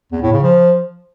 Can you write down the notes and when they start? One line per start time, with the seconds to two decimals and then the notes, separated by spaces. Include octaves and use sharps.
0.12 E2
0.22 A2
0.33 C#3
0.43 F3